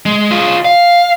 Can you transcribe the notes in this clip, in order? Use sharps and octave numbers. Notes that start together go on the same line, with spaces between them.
G#3
F4 G#4
F5